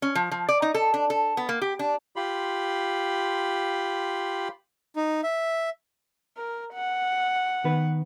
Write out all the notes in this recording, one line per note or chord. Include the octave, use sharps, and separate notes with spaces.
C#4
F3
F3
D5
D#4
A4
D4
A4
B3
A#3
G4
D4
F4 G4 B5 C6
D#4
E5
A#4
F#5
D#3 B3 B4